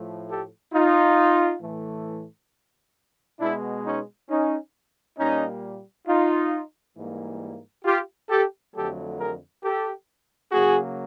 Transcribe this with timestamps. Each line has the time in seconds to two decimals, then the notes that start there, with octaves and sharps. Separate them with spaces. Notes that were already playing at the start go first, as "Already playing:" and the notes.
Already playing: A2 F3 A3
0.29 G4 A4
0.73 D#4 F4
1.62 A2 E3 A3
3.40 B2 G#3 B3 D4 E4
3.85 C#4 D#4
4.29 C#4 D#4
5.18 A#2 G3 A#3 C#4 D#4
6.07 D#4 F4
6.97 G#2 E3 G3 A#3
7.85 F4 G4
8.29 G4 A4
8.74 F2 D3 F#3 A3 G4 A4
9.18 G#4 A#4
9.63 G4 A4
10.52 C#3 F#3 A#3 F#4 G#4